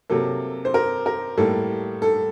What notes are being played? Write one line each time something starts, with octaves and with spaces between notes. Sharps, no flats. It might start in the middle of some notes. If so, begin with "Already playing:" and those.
C3 F#3 A#3 A4
C5
A#4
A#4
A2 G3 A#3 A4
A4